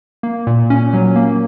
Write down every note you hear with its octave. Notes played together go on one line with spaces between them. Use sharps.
A#3
A#2
C#4
F#3
A#3